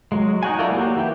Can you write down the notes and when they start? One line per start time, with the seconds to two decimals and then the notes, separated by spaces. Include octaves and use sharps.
0.12 F#3 G#3
0.43 D#4 F#4 G#5
0.59 E4 F4 A4 A#4 D5
0.70 F#3 A#3 F#4 G4
0.97 E3 E4 G5